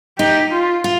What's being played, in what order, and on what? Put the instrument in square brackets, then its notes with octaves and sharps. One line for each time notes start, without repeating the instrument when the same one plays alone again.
[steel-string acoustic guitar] D#4 [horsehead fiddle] G4
[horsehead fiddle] F4
[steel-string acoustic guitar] F4